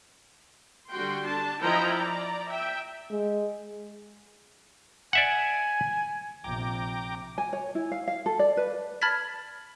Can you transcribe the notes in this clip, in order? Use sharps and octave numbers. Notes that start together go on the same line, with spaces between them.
D3 G3 F#4 G5 C6
D4 A5
F3 E4 D#5 G5 A#5
D5 A#5
E5 G5
G#3
D5 E5 F#5 G#5
A#1 C3 G5 A#5 D6
G#5
C#5
E4
F5
F5
A4
D5
B4
A5 B5 F6 G#6 A6 B6